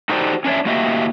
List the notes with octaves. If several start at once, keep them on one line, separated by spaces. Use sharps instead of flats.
D#4 F#4 G4 A4 C5 D5
C#4 D4 A#4 C#5 E5
A2 A#3 F#4 G4 D#5 E5